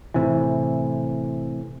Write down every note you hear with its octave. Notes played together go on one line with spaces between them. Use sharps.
A2 C3 E3